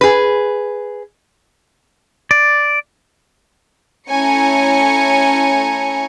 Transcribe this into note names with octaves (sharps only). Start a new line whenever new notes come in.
G#4 B4
D5
A3 C#4 E4 G#5 A#5 C#7